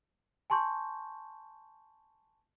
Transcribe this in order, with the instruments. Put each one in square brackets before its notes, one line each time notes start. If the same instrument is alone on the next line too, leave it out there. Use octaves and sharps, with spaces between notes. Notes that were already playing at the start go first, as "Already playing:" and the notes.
[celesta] G#5 A5 C6 C#6 G6